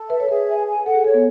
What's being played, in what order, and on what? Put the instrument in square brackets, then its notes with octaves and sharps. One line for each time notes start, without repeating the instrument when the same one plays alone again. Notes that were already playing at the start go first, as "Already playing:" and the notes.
Already playing: [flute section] A4
[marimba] B4 [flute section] E5
[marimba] C#5
[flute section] G#4 [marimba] B4
[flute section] G#5
G#5
[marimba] A4 [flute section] F#5
[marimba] G#4
[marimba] A4 [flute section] C#5
[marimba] B3